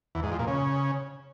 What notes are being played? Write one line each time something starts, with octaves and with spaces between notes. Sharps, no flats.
E2
G#2
F2
A#2
C#3